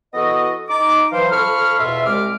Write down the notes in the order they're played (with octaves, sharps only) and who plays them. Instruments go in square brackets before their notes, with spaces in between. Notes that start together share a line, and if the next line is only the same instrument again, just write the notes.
[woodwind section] E3 B3 F#4 A4 D#5
D#4 D6
E3 F#3 C5 F5
F2 A4 F5 B5 C#6 F6
E2 B2 F4 E5
C2 G#3 D6 F6